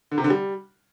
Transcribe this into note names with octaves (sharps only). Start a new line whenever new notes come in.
D3
C3
D3
G3